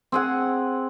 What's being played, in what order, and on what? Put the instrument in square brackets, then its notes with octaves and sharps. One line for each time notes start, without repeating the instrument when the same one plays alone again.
[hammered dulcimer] C4 G#4 F#5